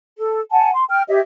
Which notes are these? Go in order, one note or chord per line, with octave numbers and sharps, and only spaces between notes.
A4
F#5 G#5 A5
C6
G5 F6
G4 C#5 D#5 E5